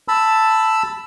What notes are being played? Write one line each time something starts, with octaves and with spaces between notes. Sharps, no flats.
A5 B5 E6